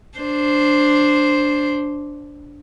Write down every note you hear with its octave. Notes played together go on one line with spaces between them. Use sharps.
D4 C5